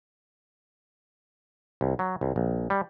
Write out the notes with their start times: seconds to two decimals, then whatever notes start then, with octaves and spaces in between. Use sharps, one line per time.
1.81 C2
1.99 F#3
2.21 C2
2.36 A#1
2.70 G3